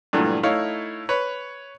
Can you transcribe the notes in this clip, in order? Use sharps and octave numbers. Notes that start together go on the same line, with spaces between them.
G2 A#2 E3 F#3 A3
A3 D#4 E4 C#5 F5
B4 C#5